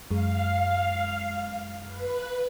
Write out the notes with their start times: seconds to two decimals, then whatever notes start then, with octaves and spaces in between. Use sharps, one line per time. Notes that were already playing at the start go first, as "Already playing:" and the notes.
0.11 F#2 G#3 F5
1.87 B4